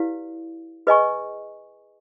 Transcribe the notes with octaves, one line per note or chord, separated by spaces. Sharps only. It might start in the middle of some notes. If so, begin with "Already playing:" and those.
Already playing: E4 G4 B4 D5 F5
G#4 B4 D#5 G#5 C#6